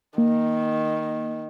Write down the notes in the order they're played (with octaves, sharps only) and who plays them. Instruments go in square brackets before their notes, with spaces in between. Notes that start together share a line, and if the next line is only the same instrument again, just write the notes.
[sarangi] D#3 [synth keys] A#3